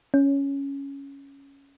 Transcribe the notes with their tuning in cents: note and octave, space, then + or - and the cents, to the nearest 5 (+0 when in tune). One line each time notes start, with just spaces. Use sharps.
C#4 +0